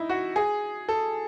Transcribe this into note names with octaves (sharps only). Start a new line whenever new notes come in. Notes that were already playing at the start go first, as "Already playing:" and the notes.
Already playing: D#4 E4
F#4
G#4
A4